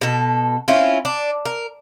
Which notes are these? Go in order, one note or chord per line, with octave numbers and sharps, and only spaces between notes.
B2 A4
C4 C#4 E4 F4
D4
A#4